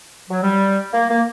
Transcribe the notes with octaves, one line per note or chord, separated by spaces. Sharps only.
F#3
G3
A#3
A#3